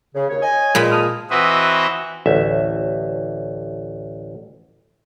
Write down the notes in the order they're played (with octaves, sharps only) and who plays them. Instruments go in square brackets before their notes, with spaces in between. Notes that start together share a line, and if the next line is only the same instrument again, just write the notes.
[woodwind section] C#3
D#2 C#5
C#5 D#5 G#5
[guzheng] A#2 G#3 B5
[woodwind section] A5 D#6 F6
[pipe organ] E3 C4 F#4 B4 D#5 E5
[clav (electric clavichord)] A1 D2 E5